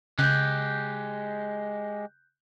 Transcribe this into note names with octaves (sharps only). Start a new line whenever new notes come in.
C#3 G#3 G4 F#6 G6